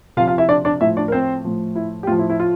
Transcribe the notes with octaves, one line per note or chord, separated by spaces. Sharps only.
C3 F3 F4 F5
F4 F5
E4 E5
D4 D5
D4 D5
A2 F3 E4 E5
D4 D5
A#4
C4 C5
A2 F3
E4
G4
A2 F3 F4
E4
E4
F4